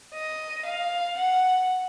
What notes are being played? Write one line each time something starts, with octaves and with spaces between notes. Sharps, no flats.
D#5
F5
F#5